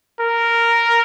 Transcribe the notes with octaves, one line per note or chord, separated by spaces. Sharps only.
A#4